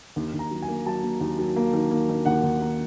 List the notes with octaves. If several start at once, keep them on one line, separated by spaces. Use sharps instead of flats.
D#2
D#2
A#5
F#3
G#5
A#3
F#3 A5
A#3
D#2
F#3
A#3
D#3
A#3
D#3
D#2 F#5
D#2
A#3